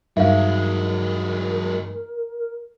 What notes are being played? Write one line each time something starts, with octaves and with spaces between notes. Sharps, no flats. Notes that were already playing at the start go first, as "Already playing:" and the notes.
G2 F#3 G#3 D#4 A#4 E5 F5